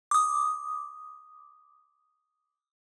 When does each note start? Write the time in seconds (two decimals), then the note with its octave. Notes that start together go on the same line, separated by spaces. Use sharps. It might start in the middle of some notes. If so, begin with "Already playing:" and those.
0.11 D6 D#6